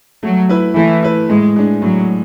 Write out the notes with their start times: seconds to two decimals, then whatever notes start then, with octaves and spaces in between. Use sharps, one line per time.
0.23 F#3 A3
0.49 E4 B4
0.76 E3 A3
1.03 E4 B4
1.29 A2 G#3
1.56 G#3 D4
1.82 A2 F#3